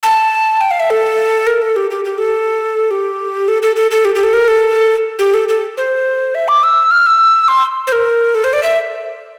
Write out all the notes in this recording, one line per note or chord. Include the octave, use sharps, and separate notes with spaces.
A5
G5
F5
E5
A4
A#4
A4
G4
G4
G4
A4
G4
A4
A4
A4
A4
G4
G4
A4
A#4
A4
G4
A4
A4
C5
E5
D6
E6
F6
E6
C6
C5
A#4
A4
C5
D5
E5